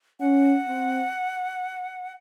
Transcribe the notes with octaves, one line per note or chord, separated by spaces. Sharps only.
C#4 F#5
C4